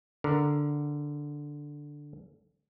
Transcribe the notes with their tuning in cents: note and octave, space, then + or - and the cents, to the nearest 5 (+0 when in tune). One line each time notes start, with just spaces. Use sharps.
D3 +0 A#4 +0